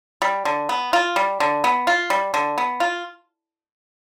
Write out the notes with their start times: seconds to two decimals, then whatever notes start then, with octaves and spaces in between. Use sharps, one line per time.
0.22 G3
0.45 D3
0.69 B3
0.93 F4
1.16 G3
1.40 D3
1.64 B3
1.87 F4
2.10 G3
2.34 D3
2.58 B3
2.80 F4